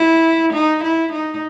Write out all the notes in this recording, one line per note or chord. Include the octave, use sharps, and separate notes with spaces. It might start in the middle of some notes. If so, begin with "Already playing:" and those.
Already playing: E4
D#4
E4
D#4